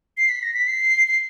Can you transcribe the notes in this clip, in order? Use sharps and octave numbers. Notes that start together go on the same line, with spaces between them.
C7
B6
A#6
B6
C7
C7